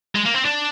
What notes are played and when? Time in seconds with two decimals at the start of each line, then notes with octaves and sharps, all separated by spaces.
0.16 G#3
0.25 A#3
0.35 C4
0.45 D4